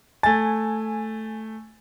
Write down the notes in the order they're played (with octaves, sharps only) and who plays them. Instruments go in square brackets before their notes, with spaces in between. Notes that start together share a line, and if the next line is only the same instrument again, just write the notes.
[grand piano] A3 A6 [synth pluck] G#5